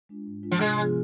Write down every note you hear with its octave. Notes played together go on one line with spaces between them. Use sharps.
G#3 D4 F4
G#2
G#3 D4 F4
F3
C3 G#3
F3 B3 F4